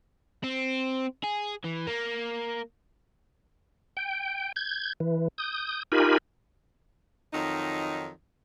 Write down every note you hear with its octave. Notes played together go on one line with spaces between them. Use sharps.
C4
G#4
E3
A#3
G5
G6 G#6
E3
D#6 G6
D#4 F4 G4 A#4 G#5 B5
F2 D#3 F#3 D#4